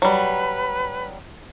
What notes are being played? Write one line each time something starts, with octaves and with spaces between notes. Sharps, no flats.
F#3 G3 B4